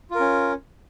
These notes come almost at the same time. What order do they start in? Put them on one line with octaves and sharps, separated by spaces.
F4 A#4 C#4